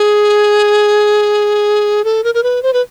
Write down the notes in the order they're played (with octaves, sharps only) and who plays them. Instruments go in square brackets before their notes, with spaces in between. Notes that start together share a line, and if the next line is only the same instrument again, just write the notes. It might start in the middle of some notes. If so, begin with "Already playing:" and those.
Already playing: [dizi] G#4
A4
A#4
A#4
B4
C5
B4